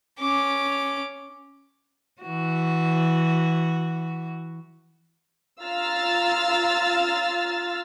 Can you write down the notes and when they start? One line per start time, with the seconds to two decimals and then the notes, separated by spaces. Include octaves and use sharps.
0.20 C#4 D6
2.22 E3 F#4
5.62 F4 F5 A#5 E6 F6 A6